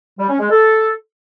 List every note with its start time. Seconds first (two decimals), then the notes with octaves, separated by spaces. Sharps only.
0.19 G3
0.30 C#4
0.40 G#3
0.50 A4